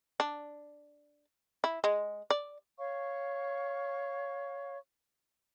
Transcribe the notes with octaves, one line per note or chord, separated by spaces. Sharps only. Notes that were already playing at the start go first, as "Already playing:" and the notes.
D4
E4
G#3
D5
C#5 F5 C#6